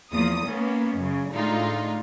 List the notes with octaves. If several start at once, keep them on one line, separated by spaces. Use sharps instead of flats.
E2 F3 A#3 D#6
A#3 B3 C#4
F#2 C#3
A2 D3 G#3 D#4 F4